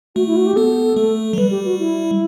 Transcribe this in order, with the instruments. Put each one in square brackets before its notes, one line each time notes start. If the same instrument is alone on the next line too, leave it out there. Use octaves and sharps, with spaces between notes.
[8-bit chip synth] A3 [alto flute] F#4
[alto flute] E4
F#4
G4
[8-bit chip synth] B3 [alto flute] A4
[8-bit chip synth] A3
F#3
[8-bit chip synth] G3 [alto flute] B4
[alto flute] G4
F#4
E4